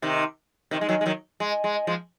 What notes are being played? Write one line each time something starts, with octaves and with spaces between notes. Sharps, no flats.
C3 D#3
C3 D#3
G#3
D#3 F#3
G#3
D#3 F#3
G#3
G#3
F3 G#3